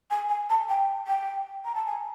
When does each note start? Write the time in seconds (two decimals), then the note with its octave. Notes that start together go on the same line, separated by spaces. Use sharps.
0.11 G#5
0.29 G#5
0.50 A5
0.69 G5
1.07 G5
1.65 A#5
1.75 A5
1.86 G#5